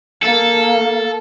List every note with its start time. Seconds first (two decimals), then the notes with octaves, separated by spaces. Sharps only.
0.23 A#3 A4 F5